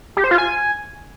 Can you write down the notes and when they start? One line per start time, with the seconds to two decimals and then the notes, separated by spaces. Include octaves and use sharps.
0.17 G4
0.24 C5
0.31 F4
0.38 G#5